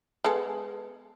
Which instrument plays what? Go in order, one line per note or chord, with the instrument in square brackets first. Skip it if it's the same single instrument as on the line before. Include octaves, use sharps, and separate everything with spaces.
[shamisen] G#3 B3 A4